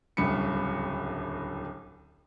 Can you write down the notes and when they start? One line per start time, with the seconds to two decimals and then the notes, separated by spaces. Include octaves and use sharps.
0.17 D1 G1 C2 C#3 B5 C#7